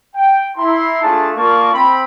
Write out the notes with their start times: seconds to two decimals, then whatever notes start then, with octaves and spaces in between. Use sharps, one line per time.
0.14 G5
0.56 E4 A#5 C6
1.02 A3 D4 F4 G#4 A5
1.36 A#3 F4 A#4 D5 A5 C#6
1.72 C4 B5